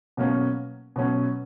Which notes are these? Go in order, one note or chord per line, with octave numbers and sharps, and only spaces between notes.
B2 F#3 A#3 C#4
B2 F#3 C#4